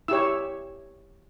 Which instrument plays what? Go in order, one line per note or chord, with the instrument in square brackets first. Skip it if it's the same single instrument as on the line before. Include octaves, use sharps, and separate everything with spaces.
[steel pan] E4 G4 C#5 E6